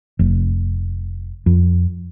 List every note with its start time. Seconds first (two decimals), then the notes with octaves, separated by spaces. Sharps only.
0.19 F1
1.46 F2